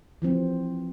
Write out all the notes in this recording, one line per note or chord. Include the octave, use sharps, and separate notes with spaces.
E3 F3 C4